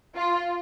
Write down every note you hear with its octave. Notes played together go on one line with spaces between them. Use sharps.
F4